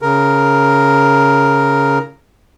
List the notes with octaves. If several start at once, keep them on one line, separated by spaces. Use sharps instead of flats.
C#3 A#4